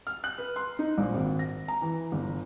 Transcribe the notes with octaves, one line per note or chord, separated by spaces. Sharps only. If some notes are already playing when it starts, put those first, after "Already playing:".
F6
F#6
B4
C6
D#4
A#1
G#1
A#6
A#5
E3
G1